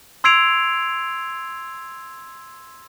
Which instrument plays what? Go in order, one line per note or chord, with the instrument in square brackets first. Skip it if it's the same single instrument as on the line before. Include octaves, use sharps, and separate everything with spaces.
[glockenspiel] C6 E6 G#6 C7 D7 F7